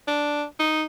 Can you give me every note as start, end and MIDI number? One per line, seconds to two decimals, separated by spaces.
0.08 0.45 62
0.59 0.84 63